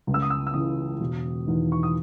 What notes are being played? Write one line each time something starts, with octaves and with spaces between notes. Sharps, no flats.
C#2
E6
D#6
E6
E6
C#3 E3 D#6
E1
E2 D#3
C#6
D#6